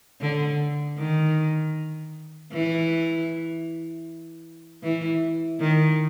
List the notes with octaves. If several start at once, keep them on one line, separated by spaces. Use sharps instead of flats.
D3
D#3
E3
E3
D#3